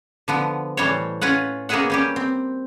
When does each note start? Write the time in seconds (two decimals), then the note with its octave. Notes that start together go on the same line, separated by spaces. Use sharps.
0.28 D3 F3 B3
0.77 A2 E3 G3 C5 C#5
1.21 C#4 F4 B4 F#5
1.69 A#3 B3 C#4 G#4 E5 F#5
1.90 G3 C#4 G4
2.16 C4